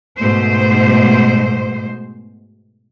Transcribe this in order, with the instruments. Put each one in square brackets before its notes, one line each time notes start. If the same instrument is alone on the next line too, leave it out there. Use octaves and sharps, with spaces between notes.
[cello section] G#2 B2 A3 C5